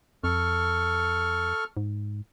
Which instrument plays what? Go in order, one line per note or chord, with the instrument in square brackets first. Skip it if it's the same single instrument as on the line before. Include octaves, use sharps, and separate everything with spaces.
[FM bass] F2 [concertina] A4 C#6 F6
[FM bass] G#2